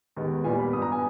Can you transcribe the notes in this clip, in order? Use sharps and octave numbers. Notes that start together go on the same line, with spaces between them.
D#2 D#3 G#3 B3
A#2 G3 B3 G#5
B5
G2 G3 B3 D#6
A#5
G#5